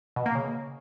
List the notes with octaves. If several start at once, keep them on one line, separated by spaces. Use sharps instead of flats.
B2
A#3
C#3